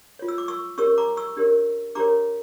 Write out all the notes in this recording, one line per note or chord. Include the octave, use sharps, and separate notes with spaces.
F4 C#5
E6
D6
C#6 E6
C#4 G4 A#4 C#5 C#6 E6
A#5 D6
C#6 E6
D4 G4 A#4 C#5
D4 G4 A#4 C#5 A#5 D6